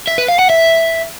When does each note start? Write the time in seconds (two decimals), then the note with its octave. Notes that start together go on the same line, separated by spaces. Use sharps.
0.07 E5
0.18 B4
0.29 F5
0.39 F#5
0.50 E5